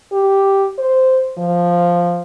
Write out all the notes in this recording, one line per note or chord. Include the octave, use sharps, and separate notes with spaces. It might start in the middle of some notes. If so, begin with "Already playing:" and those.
G4
C5
F3